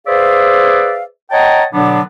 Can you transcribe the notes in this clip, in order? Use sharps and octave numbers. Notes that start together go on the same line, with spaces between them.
G#4 B4 C5 D5 E5 F5
C#5 D#5 F#5 G5 A5 A#5
B2 D3 F#3 B3 D4